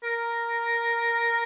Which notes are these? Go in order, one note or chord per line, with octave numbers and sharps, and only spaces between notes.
A#4